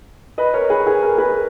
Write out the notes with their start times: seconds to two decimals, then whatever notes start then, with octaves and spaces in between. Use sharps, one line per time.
0.38 B4 D#5
0.54 A#4 C#5
0.70 G#4 B4
0.87 G#4
1.03 A#4
1.18 G#4 B4